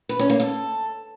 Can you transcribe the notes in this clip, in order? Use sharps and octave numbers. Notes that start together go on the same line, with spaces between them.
B4
C#4
A#3
A4